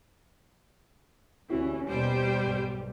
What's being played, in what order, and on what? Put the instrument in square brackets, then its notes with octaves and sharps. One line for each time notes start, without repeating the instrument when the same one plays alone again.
[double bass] D2 C#4 [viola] E3 [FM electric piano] E4 F#4 G4
[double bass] D#2 B2 [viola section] G3 [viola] C5 G5
[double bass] B1 G#2